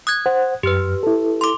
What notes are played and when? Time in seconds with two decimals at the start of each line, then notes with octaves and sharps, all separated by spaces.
0.07 D#6 F#6 G#6
0.26 C5 F#5
0.63 F#2 G4 B4 F6
1.03 E4 A4
1.41 C6 D6